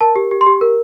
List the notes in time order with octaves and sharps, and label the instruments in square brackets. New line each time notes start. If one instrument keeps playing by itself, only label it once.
[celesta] A#4 A5
G4
G4
C6
G4
A#4